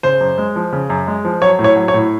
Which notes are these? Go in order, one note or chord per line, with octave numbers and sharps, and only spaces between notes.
C#3 C5
F#2
G#3
F3
C#3
F#2
G#3
F3
F#3 C#5
A2
C#5
F#3
C#5
A2